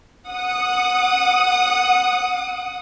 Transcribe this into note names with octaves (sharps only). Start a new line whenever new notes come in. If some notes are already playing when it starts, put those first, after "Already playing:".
F#5 D#6